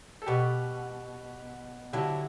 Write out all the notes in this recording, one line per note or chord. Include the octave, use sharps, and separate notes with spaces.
A4
B2 G4 B4
D3 F#3 E4 G4